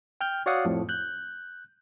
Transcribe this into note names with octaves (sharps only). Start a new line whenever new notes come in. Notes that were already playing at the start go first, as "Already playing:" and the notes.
G5 F6 G6
F#4 C#5 D5 F5 F#5 D#6
F2 A2 F3
F#6 G6